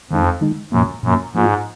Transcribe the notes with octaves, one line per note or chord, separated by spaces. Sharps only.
F2 D#3 G#3 D#4
D#3 G#3 D#4
F#2 A#2 F3 A#3
F#2 A#2 F3 A#3
G#2 F3 A#3 F4